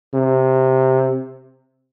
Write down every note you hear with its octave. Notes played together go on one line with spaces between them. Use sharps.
C3